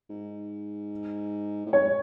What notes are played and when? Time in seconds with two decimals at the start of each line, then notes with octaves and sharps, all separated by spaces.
0.09 G#2
1.66 A2
1.73 G#2 C#5